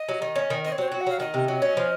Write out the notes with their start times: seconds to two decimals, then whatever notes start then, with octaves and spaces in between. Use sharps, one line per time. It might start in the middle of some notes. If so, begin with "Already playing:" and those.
Already playing: D#5
0.09 F#3
0.22 D#3
0.36 C#4
0.50 D#3
0.64 C4 D#5
0.72 C#5
0.78 F#3 C5
0.88 F#4 C#5
1.01 F#5
1.07 F#3 F5
1.20 D#3 D#5
1.34 C3
1.48 F#3
1.62 C#4
1.77 F3